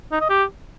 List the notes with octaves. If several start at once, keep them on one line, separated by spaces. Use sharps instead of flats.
D#4
D#5
G4